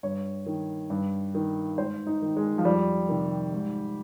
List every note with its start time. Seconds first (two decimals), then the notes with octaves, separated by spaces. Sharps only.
0.03 G2 C#5
0.46 D#3
0.90 G2
1.35 D#3
1.78 G#2 C5
2.07 D#4
2.22 D#3
2.37 G#3
2.58 F3
2.65 F2 G3
3.09 C3 D#3
3.53 G#2